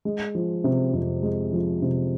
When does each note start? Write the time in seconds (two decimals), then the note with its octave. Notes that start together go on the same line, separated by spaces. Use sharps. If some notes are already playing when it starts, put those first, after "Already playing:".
0.05 G#3
0.35 F3
0.64 C3
0.93 F2
1.23 G#3
1.53 F3
1.82 C3